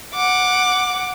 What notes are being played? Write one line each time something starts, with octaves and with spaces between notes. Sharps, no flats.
F#5 D6